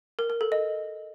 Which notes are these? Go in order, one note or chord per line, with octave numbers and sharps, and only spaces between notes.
A#4
A#4
A4
D#5